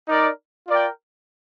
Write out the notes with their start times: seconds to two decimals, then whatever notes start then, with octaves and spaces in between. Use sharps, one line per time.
0.08 D#4 A#4 D5
0.68 F4 A#4 D5 G5